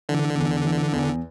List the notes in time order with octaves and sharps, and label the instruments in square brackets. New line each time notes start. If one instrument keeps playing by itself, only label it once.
[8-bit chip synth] D3 [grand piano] E3
[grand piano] E2
E3
E2